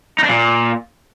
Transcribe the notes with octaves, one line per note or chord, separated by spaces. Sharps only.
D#4
D4
A#2